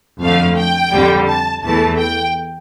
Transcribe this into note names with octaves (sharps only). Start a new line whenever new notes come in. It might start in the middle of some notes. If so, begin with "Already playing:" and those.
F2 D3 F3 A3 F5
G5
F2 D3 G3
A5
E2 E3 A3 A5
G5